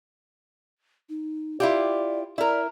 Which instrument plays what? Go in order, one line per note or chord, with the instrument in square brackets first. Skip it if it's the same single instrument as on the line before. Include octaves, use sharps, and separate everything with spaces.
[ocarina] D#4
[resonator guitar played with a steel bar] E4 F4 G4 [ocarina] D5
[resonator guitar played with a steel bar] E4 A#4 [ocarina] D5